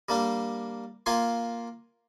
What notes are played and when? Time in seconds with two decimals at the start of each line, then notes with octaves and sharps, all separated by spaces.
0.09 G3 A#3 D4
1.06 A#3 F4 G#5 C6